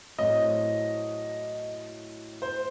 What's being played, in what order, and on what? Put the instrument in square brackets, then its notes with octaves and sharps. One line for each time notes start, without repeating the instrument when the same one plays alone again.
[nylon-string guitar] A2 F#3 C4 [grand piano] D#5
[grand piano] C5